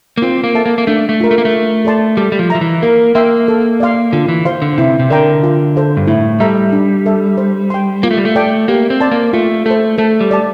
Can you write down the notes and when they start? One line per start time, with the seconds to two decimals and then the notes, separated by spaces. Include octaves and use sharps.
0.18 A#3
0.22 C4 F4
0.44 A#3
0.55 A4 E5 A5
0.66 A#3
0.78 A#3
0.87 A3 D4
1.09 A3
1.20 F4 A#4
1.31 A3
1.38 A#3
1.45 A3
1.53 F4
1.85 A4 D5 A5 C6
2.17 G3 A4
2.32 G3
2.39 F3
2.50 F3 E5 A#5
2.61 E3
2.82 A#3 A#4
3.15 A#3 E5 G5 C6
3.48 A4
3.80 D5 F5 C6
4.13 D3 F4
4.28 E3
4.45 C5 F5 C6
4.62 D3
4.78 C3 E4
4.99 C3
5.10 D3 A#4 D5 G5 A#5
5.43 F4
5.76 A4 C5 F5
5.97 G2
6.07 A2 E4
6.40 G3 A4 E5 A#5
6.72 D4
7.06 A4 E5
7.38 C5
7.70 G5 C6
8.03 A#3 F4
8.11 A3
8.17 G3
8.25 A3
8.35 A4 D5 G5
8.68 A#3 G4
8.90 C4
9.01 D5 A5 C6
9.12 A#3
9.33 A3 F4
9.66 A3 A4 C5
9.98 A3 A4
10.21 G3
10.31 D5 A5